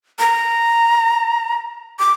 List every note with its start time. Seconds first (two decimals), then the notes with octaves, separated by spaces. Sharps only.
0.19 A#5
1.99 D6